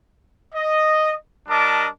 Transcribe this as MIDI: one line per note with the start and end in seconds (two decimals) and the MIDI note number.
0.54 1.15 75
1.49 1.88 55
1.49 1.88 62
1.49 1.88 70
1.49 1.88 75
1.49 1.88 81
1.49 1.88 86